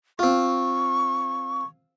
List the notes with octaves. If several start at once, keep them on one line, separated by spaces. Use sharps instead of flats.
C4 F4 C#6